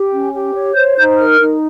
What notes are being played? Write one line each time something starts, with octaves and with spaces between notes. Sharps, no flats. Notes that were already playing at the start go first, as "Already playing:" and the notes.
Already playing: G4
C#4
G4
C#5
C5 G6
D#4 G6
A#4 F6
D#4